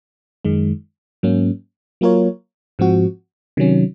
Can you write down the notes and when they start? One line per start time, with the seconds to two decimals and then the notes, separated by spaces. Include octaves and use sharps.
0.45 F#2 D#3 G#3
1.23 G#2 F#3 A#3 C#4
2.01 F#3 A#3 F4 A#4 C#5
2.79 G#2 F3 C4 F#4
3.57 C3 D#3 F#3 C#4